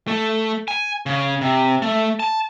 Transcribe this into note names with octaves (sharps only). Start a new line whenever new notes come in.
A3
G#5
C#3
C3
A3
A5